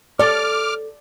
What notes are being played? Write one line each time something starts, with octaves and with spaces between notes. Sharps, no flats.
A4 C#5 D5 D6 F6